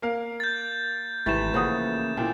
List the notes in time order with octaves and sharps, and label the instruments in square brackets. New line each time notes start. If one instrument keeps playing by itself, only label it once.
[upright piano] A#3 A#4 F5
[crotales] G6 A6
[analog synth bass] G#1 [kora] C3 E3 A3 [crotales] A6 E7
[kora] C#3 [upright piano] F3 F#5 D#6 [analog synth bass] A#3
[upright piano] A#2 E3 [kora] C4